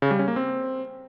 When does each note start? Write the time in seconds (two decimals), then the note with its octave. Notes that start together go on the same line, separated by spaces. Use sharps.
0.02 C#3
0.11 G3
0.19 C#4
0.28 A#3
0.36 C4